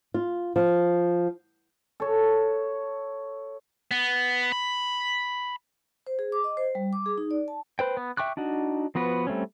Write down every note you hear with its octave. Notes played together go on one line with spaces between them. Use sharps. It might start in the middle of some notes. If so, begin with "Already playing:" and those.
F4
F3
A4 C#5
B3
B5
C5
G#4
D6
D#5
C5
G3
D6
G#4
D#4
D5
A5
B4 C5 G5
B3
E5 G5 C#6 D6 F#6
D4 D#4 F#4
F3 B3 F#4 B4
G3 A3 C4 C#4